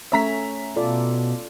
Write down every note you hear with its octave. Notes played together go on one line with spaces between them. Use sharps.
A3 C#4 C#5 E5 A#5 B6
B2 F4 A4 D5